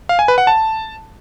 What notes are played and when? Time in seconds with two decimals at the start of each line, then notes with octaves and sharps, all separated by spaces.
0.09 F5
0.19 G#5
0.28 B4
0.38 F#5
0.47 A5